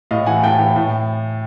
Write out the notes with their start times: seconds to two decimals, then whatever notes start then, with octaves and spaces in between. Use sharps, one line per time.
0.11 A2 D#5 F5
0.26 E3 F#5 G#5
0.43 A2 G5 A5
0.59 E3
0.76 A2